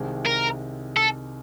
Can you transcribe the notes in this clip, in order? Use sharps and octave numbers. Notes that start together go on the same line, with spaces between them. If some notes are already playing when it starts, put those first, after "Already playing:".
Already playing: C2 C3 D#3 G#3
A#4
A4